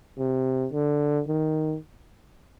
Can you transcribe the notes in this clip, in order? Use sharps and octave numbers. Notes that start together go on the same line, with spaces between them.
C3
D3
D#3